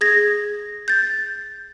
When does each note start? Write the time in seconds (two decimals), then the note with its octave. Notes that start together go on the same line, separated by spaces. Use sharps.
0.01 G#4 G#6 A#6
0.88 G6 A6